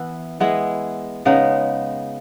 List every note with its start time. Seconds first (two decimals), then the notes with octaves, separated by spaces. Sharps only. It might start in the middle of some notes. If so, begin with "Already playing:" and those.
Already playing: E3 B3 E4 B4
0.40 G#3 B3 E4 G#4
1.25 C#3 G#3 B3 D#4